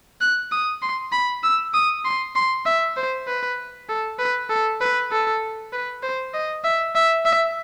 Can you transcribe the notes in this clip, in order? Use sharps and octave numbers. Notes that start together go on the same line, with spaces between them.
F#6
D#6
C6
B5
E6
D#6
C6
C6
E5
C5
B4
A4
B4
A4
B4
A4
B4
C5
D#5
E5
E5
E5